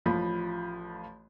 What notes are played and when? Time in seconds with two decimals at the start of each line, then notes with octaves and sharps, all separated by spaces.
0.06 A1 F3 B5